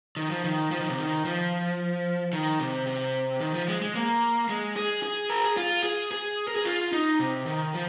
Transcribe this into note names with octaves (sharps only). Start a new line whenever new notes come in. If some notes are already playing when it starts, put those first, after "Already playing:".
D#3
F3
D#3
F3
D#3
C3
D#3
F3
D#3
C3
C3
D#3
F3
G#3
G#3
A#3
G#3
G#4
G#4
A#4
G#4
F4
G#4
G#4
A#4
G#4
F4
D#4
C3
D#3
F3